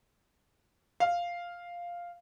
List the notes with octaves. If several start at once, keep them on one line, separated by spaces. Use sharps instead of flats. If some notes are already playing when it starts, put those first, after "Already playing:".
F5